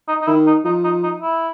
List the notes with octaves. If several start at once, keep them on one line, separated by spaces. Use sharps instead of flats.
D#4
D#4
D#3 E4
D#4
F3 D#4
D#4
D#4
E4